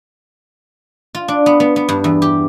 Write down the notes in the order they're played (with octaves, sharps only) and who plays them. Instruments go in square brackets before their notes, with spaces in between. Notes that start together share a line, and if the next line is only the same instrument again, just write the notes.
[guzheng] F4
D4
B3
B3
B3
G2
E2
G4